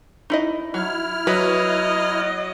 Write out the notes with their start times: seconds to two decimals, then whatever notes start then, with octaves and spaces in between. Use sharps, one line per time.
0.30 D#4 E4 D#5
0.74 F#3 E4 F6
1.27 F#3 B4 D#5